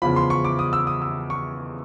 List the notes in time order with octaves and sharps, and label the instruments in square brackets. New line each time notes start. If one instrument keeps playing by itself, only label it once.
[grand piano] E2 C#3 F3 B5
C6
C#6
D6
D#6
E6
D#6
E6
C#6